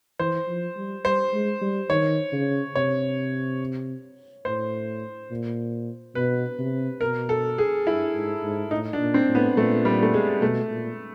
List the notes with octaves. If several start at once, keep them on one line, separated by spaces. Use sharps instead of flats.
E3 C5
F3
G3
G3 C5
G#3
G3
D#3 C#5
C#3
C3 C#5
A2 C5
A#2
B2 B4
C3
B2 A#4
A4
G#4
G2 E4
G#2
G#2
A2 D#4
D4
A#2
C4
A2
B3
A#2 A3
G3
A3
G#3
B2 A3
A#2